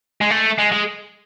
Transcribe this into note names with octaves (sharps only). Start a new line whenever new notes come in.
G#3
A3
G#3
G#3